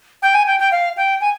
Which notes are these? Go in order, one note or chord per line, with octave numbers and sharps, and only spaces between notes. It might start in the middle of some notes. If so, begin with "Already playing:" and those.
G5
G#5
G5
G5
F5
G5
G#5